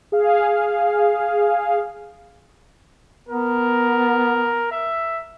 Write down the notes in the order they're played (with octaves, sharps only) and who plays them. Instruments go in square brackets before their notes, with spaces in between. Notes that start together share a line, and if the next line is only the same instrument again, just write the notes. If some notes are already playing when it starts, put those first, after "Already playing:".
[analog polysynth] G#4 F5
[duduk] B3 [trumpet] A#4
[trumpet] E5